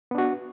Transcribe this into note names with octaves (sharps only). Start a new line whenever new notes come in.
B3 D4 F#4